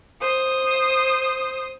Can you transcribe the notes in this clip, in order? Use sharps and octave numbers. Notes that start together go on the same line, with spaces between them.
C5 D#6